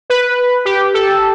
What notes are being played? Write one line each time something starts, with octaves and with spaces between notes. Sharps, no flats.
B4
G4
A4